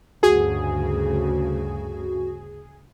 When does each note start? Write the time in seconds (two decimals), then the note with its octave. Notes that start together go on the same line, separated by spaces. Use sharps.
0.23 D2 G2 C#3 F#4 G#4